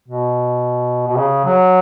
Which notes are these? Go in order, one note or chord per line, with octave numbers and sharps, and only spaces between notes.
B2
B2
C#3
F#3